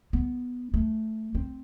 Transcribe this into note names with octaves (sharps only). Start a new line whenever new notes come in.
B3
A3
C4